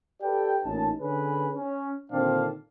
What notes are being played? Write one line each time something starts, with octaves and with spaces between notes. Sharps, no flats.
G4 A4 B4 D5 G5
A1 A#2 C#4 D#4 A5
D3 C#4 G#4 B4
C#4
A#2 D3 D#3 C4 D4 F5